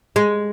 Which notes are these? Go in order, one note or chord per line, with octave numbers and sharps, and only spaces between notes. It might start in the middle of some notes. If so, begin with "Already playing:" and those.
G#3